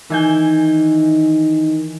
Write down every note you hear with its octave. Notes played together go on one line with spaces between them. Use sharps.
D#3 E3 G#5 G6